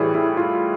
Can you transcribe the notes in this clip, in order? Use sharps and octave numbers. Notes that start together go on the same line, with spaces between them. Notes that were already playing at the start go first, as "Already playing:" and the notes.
Already playing: A2 E3 G3 E4 G#4
E4
F4